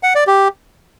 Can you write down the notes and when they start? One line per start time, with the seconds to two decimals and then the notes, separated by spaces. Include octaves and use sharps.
0.03 F#5
0.15 D5
0.27 G4